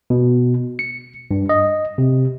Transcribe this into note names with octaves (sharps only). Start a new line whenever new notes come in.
B2
C#7
G2
D#5
C3